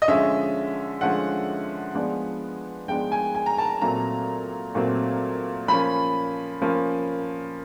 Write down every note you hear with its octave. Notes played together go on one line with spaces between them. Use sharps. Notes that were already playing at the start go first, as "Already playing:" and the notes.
D#5
D3 F3 G#3 C#4 E5
D3 F3 G#3 C#4 F#5
F3 G#3 B3 D4
F3 G#3 B3 D4 G5
G#5
G#5
A#5
A5
A#2 F#3 A3 C4 A#5
A#2 F#3 A3 C4
F3 A#3 C#4 B5
F3 A#3 C#4